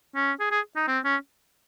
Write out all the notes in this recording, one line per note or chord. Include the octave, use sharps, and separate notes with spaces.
C#4
G#4
G#4
D#4
C4
C#4